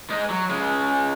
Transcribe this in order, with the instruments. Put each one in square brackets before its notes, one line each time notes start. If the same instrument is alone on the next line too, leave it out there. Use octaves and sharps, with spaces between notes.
[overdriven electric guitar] G#3 D#4
F#3
C#3 G#3